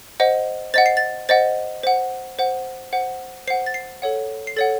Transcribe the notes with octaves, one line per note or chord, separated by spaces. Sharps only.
C5 D#5 F#5
C5 D#5 F#5 A6
C7
A6
C5 D#5 F#5 A6
C5 F#5
C5 F#5
C5 F#5
C5 F#5 C7
A6
C7
A4 C#5 F#5
C7
A4 C#5 F#5 A6